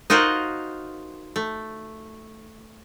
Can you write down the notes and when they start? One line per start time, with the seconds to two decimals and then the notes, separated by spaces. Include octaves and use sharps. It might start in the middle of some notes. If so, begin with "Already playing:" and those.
0.10 D#4 F4 F#4 A#4 C5
1.36 A3